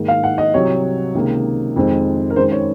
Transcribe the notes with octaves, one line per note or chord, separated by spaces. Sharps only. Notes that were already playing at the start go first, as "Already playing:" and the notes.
Already playing: G#2 D#3 A#3
F5
F#5
D#5
C2 C3 F#3 C#5
C#2 C3 D#3 A#3
F2 D#3 G#3 C4
A#4
F#2 D#3 G#3 C4 C5
C#5